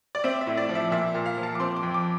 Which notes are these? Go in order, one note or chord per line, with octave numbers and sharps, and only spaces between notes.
D5
C4 E5
E5
A2
D5
F3
E5
A#2 E5
A#2
F5
F3
A5
D6
C4 C6
D6
F2
D6